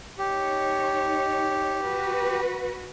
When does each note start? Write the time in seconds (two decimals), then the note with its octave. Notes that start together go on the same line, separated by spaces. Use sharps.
0.18 D#4 G4 C#5
1.84 F#4 B4